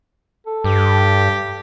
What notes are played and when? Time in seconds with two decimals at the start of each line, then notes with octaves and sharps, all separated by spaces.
0.47 A4
0.64 G2 G4